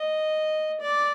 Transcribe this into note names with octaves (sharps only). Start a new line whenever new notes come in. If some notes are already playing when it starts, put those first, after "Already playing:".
Already playing: D#5
D5